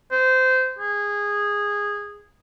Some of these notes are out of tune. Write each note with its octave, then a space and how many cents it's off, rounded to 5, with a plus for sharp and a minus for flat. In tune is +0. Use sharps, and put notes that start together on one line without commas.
C5 -20
G#4 -15